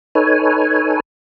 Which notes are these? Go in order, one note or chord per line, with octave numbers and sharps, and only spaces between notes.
D#4 A4 B4 C#5 G#5